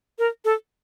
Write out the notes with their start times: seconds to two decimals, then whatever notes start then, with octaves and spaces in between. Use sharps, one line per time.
0.19 A#4
0.45 A4